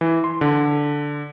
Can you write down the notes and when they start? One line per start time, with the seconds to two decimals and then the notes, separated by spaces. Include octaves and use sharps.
0.01 E3
0.24 C6
0.41 D3